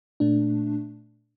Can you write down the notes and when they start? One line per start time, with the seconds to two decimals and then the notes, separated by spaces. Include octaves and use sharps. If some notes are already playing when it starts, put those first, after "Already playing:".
0.20 A#2 A3 D4